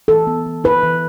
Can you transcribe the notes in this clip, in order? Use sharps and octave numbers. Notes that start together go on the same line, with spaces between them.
E3 A4
B3
E3
E4 B4
E3